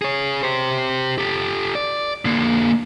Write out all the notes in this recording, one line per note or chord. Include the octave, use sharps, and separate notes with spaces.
G#4 C#5
G4 C5
G4 A4
D5
D3 A#3